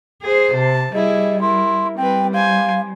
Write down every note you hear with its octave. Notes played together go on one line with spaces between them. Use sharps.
G#4 C5
C3 A5
G3 E4 G#4 D#5
E4 A#4 C6
G3 C4 B4 G5
C5 F5 G#5